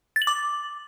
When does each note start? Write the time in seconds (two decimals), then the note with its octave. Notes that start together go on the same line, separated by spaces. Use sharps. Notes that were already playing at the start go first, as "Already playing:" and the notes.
0.16 A6
0.22 F#7
0.27 D6